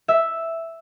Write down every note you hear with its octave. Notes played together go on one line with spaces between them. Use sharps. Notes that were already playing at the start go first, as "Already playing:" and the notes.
E5